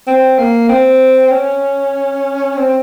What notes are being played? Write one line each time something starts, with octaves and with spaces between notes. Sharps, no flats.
C4
A#3
C4
C#4
C4